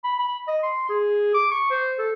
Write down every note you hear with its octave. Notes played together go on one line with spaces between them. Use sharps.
B5
B5
D#5
C6
G#4
D6
C#6
C5
A4